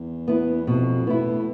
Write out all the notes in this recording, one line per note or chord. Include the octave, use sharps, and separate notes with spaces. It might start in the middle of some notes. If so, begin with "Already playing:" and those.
Already playing: E2
B3 E4
F2 B2
A2 B3 E4